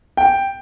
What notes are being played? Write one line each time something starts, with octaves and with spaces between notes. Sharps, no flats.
G5